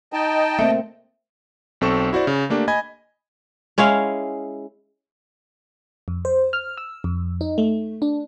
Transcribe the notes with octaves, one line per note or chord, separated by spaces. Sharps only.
D#4 D#5 G5 A5
A3 A#3 C4 E5
B1 C4 A4 C#6 E7
E4 F#4 C5 D5
C#3
A3 A#3 D4 G4
D#5 G#5 B5 G#6
G#3 C#4 E4 F5
F2
C5
F6
E6
F2
D#4
A3
D4